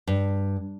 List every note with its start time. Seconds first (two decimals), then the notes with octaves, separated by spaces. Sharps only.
0.07 G2